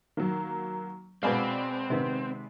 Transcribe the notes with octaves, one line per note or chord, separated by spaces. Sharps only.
D#3 F#3 A#3
B2 G#3 C4 G#4 D5 F5 B5
C3 D#3 B3